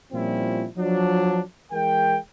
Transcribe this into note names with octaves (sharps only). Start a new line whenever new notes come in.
A#2 F3 G3 C4 C#4 E4
F3 F#3 D4
E3 G#3 A#4 G5